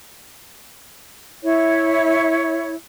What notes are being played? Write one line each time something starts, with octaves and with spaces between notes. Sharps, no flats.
E4 C#5